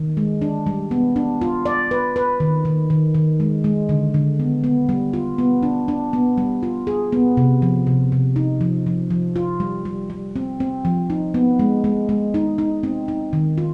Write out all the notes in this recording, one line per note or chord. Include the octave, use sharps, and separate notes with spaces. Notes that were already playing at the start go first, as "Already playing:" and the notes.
Already playing: D#3
G#3
D4
G3
B3
D4
F4
D5
B4
B4
D#3
D#3
D#3
D#3
G#3
G#3
D3
D3
B3
B3
G3
F4
B3
D4
D4
B3
G3
F4
G#4
B3
C3
F3
C3
C3
D#4
F3
F3
F3
F4
G3
G3
G3
C4
C4
F3
D#4
B3
G#3
G#3
G#3
D#4
D#4
C4
D#4
D#3
F4